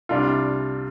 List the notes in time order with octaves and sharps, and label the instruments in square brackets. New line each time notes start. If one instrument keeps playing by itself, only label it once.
[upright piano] C2 C3 G3 D4 F4